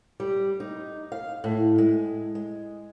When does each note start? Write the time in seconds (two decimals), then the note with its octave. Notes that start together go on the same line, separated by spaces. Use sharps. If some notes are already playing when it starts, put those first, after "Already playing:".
0.20 G3
0.60 D#4
1.12 F5
1.44 A2
1.78 G#3
2.35 G#3